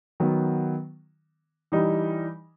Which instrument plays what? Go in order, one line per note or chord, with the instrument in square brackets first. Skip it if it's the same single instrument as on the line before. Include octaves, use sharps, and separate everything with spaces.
[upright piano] D#3 F#3 B3
E3 G3 D#4